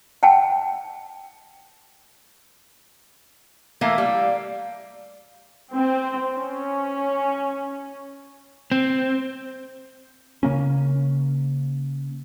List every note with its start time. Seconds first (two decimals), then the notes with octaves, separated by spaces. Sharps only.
0.23 F#5 G5 A5
3.81 E3 A3 A#3 F5
3.98 G3
5.74 C4
6.37 C#4
8.72 C4
10.43 C#3 A#3 C#4